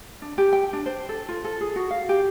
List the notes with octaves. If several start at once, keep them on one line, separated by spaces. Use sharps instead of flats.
D4
G4
G5
D4
C5
A4
F4
A4
G#4
F#4
F5
G4